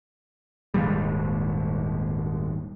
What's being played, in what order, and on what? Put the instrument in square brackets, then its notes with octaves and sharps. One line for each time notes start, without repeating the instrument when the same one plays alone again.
[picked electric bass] D#1 D#2 G#2 G3